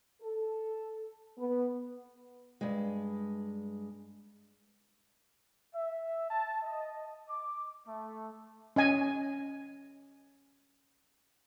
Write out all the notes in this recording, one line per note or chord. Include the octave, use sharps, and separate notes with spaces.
A4
B3
G2 G#3
E5
A5
D#5
D6
A3
C#4 D#5 G#5